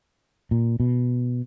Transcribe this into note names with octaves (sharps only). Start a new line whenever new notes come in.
A#2
B2